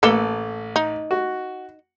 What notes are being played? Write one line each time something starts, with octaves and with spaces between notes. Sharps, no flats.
A1 A#3 A4 B4
D#4
F#4